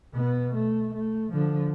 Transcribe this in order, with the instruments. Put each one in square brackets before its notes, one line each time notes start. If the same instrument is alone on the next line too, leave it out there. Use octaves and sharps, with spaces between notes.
[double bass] B2 B3
A3
A3
D3 F3